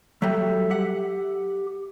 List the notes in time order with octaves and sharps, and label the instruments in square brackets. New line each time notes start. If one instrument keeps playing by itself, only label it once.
[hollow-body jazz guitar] F#3 G3 [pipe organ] A4 E5
[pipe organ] G4 [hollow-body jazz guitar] F#5